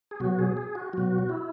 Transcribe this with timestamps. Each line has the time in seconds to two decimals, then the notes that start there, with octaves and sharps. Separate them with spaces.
0.11 G#4
0.20 B2 F#3 F#4
0.39 G#4
0.57 G#4
0.75 F#4
0.93 B2 F#3 F#4
1.29 E4